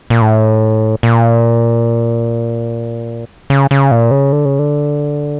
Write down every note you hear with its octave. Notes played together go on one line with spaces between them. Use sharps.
A#2
A2
A#2
C#3
C#3
A#2
C#3
D3
C#3
D3